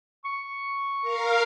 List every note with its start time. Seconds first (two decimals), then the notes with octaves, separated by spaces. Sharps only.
0.25 C#6
1.01 A#4 F5